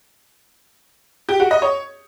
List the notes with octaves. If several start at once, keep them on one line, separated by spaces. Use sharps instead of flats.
G4
F#4
D#5
C#5